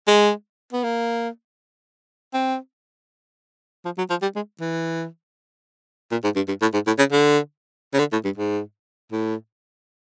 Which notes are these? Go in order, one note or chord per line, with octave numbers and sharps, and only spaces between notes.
G#3
B3
A#3
C4
F3
F#3
F3
G3
G#3
E3
A#2
G#2
G2
G2
A2
G#2
A2
C#3
D3
C#3
D3
A2
G2
G#2
A2